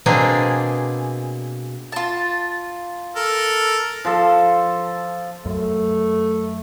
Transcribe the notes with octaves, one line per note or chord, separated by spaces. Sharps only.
B2 A#3 C4 D4 G#4
F4 A5
A4 A#4
F3 A4
F#2 A3